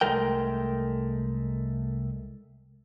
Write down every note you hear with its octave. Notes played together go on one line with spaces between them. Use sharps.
C2 G#3 A3 A#4 G5